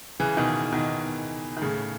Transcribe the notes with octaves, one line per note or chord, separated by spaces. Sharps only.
C#3 E3
B2 D#3
B2 D#3
D#3
A2 C#3